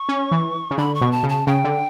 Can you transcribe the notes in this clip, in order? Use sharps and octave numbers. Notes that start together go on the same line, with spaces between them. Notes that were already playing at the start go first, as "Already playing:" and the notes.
Already playing: C#6
C#4
E3
C#3
D3 B5
C#6
B2
A5
C#3
A5
C#3 G5
D3